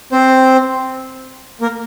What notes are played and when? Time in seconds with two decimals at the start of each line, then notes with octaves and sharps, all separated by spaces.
0.12 C4 C5
1.61 A#3 A#4